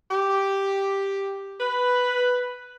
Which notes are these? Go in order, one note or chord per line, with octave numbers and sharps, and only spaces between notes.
G4
B4